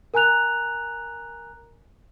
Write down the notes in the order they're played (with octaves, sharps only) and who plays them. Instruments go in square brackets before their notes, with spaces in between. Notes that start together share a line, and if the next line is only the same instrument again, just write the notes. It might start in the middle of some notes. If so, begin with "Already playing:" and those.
[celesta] A#4 G#5 A#5 F#6 F7